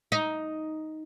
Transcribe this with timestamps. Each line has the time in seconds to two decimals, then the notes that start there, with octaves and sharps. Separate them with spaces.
0.12 D#4